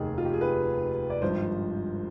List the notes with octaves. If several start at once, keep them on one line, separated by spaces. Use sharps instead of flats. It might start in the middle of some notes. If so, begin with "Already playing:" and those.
Already playing: F1 D#2 D#3 G#4
F4
G4
G#4
B4
D5
G#1 G2 F3 C5